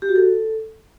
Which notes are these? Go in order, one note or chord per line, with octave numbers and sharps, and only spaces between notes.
G4
F#4
A4